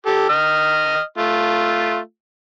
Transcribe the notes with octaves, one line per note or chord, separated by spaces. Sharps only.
G4 A4
D#5 F6
A3 F4